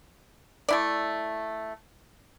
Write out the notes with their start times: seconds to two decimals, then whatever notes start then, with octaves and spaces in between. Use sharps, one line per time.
0.69 A3 E4 D5